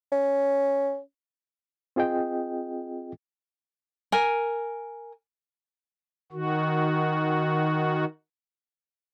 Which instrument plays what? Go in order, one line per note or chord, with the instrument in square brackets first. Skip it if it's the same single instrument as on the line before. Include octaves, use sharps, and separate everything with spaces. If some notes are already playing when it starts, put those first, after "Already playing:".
[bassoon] C#4
[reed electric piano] C4 F4 G#4 D#5 G5
[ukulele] A#4 G#5
[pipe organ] D#3 F#4